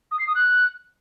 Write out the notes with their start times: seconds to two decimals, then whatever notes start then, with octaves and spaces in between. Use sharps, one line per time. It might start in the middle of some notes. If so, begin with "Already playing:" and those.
0.11 D#6
0.19 C7
0.27 D#6
0.35 F#6